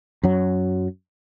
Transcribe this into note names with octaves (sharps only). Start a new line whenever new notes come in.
F#2 F#3